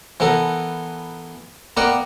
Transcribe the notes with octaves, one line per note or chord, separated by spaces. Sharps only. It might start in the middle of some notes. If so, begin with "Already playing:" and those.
E3 B3 A4 A#4
A#3 B3 A#4 D5 F#5 G5